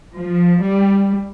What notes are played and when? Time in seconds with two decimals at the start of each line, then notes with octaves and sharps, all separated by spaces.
0.17 F3
0.62 G3